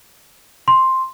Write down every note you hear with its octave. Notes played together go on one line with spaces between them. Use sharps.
C6